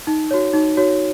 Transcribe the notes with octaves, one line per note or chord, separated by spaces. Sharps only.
D#4
F#4 C#5
D#4
F#4 C#5